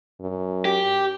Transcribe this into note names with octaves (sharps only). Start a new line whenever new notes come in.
F#2
G4